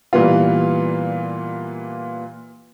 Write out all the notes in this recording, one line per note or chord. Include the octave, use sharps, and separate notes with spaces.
A#2 E3 G3 B3 F4